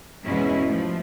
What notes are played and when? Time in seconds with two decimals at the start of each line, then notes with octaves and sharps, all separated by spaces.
0.25 E2 G#2 B2 G#3 C#4 E4
0.66 F3 A3